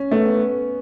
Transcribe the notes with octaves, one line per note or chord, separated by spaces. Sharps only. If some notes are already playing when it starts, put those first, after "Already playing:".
Already playing: C#4
A3 B3
B3